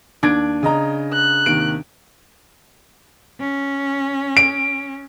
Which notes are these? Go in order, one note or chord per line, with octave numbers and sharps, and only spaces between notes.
D#2 D4 G#6 D7
C#3 D#5 A#5
F#6
D#2 C3 D#3 D7
C#4
D7